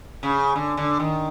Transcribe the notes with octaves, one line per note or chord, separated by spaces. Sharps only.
C#3
D3
D3
D#3